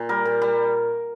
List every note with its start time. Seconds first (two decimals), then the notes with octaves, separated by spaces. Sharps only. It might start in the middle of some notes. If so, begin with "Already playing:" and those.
Already playing: A#2
0.09 G3 A#4
0.25 A#2
0.42 G3